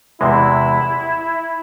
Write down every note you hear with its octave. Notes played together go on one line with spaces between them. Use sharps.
E2 C3 E3 G#3 C4 E4